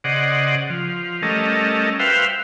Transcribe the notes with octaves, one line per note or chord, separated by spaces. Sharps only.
C#3 G#4 C5 D5 D#5 F#5
F3
G3 A3 C#4 A4 A#4 D#5
F#4 B4 C5 E5 F5 G5